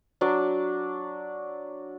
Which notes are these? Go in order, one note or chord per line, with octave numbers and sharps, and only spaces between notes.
F#3 D4 D5